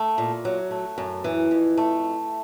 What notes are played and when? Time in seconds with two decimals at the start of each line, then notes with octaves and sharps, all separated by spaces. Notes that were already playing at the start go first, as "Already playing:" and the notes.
Already playing: A3
0.18 A#2
0.45 F#3
0.71 A3
0.98 F#2
1.24 E3
1.51 F2
1.77 A3